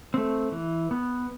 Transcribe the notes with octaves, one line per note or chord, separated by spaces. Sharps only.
A3 C4
E3
B3